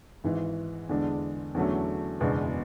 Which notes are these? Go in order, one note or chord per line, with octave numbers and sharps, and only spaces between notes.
G#1 G#2 E3
E2 D3 G#3 D4
E2 D3 F#3 A3 C#4
F#1 E2 B2 G#3 D4